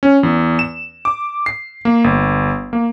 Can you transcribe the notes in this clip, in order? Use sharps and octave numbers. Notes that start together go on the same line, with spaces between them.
C#4
E2
E7
D6
C7
A#3
G1
A#3